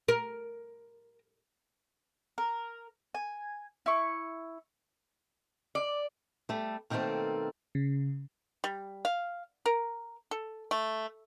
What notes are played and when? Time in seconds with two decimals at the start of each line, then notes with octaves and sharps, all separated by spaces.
0.08 A#4
2.38 A#4
3.15 G#5
3.86 E4 C#6
5.75 D5
6.49 G3 A3
6.90 B2 D#3 A3 A#3 C4 A4
7.75 C#3
8.64 G3
9.05 F5
9.66 A#4
10.31 A4
10.71 A3